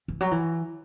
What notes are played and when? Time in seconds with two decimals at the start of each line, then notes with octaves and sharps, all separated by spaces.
0.08 E3
0.21 F#3
0.31 E3